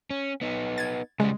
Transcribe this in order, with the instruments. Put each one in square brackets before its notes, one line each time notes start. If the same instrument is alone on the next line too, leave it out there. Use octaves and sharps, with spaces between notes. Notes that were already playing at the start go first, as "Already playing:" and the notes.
[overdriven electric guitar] C#4
B3 D#4
[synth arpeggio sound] G#6 A6
[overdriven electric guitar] C#3 G3 [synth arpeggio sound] G#3